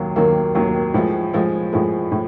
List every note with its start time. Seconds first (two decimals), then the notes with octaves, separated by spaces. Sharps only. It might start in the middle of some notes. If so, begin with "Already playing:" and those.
Already playing: D#2 D#3 F#3 A#3
0.16 D#2 D#3 F#3 A#3
0.55 D#2 D#3 F#3 A#3
0.94 A2 F3 G#3
1.33 A2 F3 G#3
1.73 A2 F3 G#3
2.12 A2